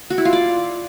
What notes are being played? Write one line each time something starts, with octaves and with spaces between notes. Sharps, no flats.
F#4
E4
F4
D5